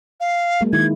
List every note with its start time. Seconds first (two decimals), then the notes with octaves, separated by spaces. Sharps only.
0.20 F5
0.61 F#3 G#3 A#3
0.73 D#3 E4 G#6